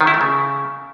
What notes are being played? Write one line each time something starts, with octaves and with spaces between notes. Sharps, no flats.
D#3
E4
A3
C#3